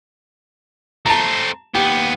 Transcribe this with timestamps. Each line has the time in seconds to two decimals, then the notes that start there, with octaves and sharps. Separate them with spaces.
1.06 A3 C4 A5 A#5
1.75 D#2 B3 G4